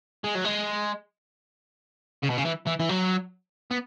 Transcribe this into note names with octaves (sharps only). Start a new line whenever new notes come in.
G#3
F#3
G#3
C#3
B2
C#3
E3
E3
E3
F#3
B3